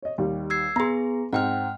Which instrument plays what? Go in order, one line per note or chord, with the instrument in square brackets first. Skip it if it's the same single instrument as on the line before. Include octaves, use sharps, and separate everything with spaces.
[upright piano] C#5 D#5
D#2 D#3 G3
[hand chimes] E6 G#6 C7
[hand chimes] B3 G#4 [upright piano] A#5 C6
[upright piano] G#2 C4 [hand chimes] F#5 G5 F6